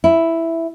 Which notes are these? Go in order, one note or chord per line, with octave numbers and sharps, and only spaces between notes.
E4